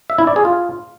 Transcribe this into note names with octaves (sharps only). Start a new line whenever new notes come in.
E5
E4
D5
G#4
F4